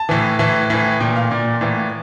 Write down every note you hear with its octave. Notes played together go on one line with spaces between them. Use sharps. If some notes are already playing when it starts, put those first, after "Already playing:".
Already playing: A5
A2 E3
A2 E3 A5
A2 E3
A#2 G5
F5
A#2 D5
A2 E3